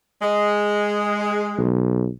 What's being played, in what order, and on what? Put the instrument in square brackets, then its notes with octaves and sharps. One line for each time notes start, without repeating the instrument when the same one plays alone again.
[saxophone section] G#3
[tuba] B1